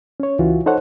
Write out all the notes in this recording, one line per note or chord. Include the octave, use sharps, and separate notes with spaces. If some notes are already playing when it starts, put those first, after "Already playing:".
C#4 C#5
C#2 E3 F4 F#4
D#4 A4 C5 C#5 F#5